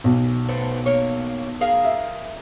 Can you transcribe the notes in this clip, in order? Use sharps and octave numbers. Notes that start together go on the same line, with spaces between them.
B1
A3 B3 C4
A#3 C#5
G#4 A#4 F5
E5